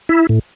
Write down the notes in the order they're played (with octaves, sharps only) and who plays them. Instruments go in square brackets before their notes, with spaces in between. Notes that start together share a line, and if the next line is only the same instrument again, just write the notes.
[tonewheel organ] E4
A2